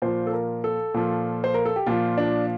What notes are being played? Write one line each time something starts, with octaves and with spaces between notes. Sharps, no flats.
A#2 F3 C5
A4
A#4
A4
A#2 F3
C5
A#4
A4
G4
A#2 F3 F4
D4